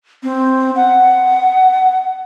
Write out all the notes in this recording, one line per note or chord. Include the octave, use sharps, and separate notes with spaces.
C4
F#5